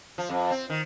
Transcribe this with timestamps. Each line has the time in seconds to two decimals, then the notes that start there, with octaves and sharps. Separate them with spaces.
0.18 F3
0.29 F2
0.51 C4
0.70 D#3